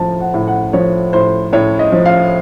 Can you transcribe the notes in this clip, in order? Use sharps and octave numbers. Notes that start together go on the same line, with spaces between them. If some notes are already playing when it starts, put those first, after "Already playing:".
Already playing: A2 F3 A5
F#5
A2
F#5
F3 C#5
A2 C5
A2 C#5
D#5
F3
F5